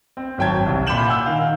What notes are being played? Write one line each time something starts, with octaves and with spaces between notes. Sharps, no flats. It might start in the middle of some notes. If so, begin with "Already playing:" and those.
C4
G#1 F#3 G5 A5 G#6
C2 C3
A#2 B5 D6 G6 E7 F#7
F#5 G#5 E6 G6
D#3 F5